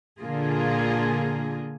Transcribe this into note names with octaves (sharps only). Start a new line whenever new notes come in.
A#2 D3 A#3 F4 G#4